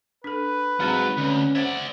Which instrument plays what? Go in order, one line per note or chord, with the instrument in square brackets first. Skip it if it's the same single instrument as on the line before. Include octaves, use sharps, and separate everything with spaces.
[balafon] D4 A4 [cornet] B4
[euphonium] G#2 [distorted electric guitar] F#3 [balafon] G#3 C4 A#5
[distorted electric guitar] D2 [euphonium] C#4
[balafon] C5 F#5 [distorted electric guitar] D5 E5